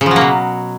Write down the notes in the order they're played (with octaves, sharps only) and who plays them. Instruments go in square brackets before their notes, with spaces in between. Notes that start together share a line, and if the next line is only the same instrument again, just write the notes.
[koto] C#3
F3
F#3
A#3
B2